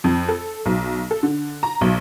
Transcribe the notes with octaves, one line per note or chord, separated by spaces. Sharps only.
F2
A4
B1
A4
D3
A#5
B1